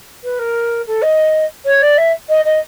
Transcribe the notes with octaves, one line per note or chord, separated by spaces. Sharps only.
B4
A#4
A4
D#5
C#5
D5
E5
D#5
D#5